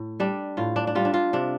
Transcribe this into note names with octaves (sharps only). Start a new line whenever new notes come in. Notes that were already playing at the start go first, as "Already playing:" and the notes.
Already playing: A2
G3 D4
A2 F4
D4
D4
G3 F4
D4
F4
C3 D4